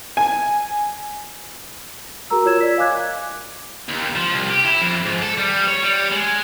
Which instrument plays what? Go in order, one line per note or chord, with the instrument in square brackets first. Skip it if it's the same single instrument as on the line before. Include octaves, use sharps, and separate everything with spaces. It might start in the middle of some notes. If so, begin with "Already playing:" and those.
[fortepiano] G#5
[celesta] F#4 G#4 A#4 A#5 E6
F4 A#4 C#5 E6 G#6 E7
D5 B6
D#5 F5 G#5 D6 F#6 G#6
[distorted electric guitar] D#2
F3
C2
G4
E4
F2
G#2
A4
G3
C#5
G3
G#3